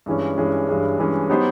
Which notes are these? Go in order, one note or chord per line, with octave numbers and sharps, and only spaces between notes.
G2 E3 G#3 C#4
G2 E3 G#3 C#4
G2 E3 G#3 C#4
G2 E3 G#3 C#4
F#3 B3 D#4 G4 C5